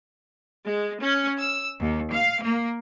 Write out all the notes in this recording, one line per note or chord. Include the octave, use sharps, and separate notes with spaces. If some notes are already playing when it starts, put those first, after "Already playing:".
G#3
C#4
E6
D#2
F5
A#3